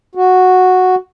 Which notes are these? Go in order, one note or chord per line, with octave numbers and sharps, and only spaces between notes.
F#4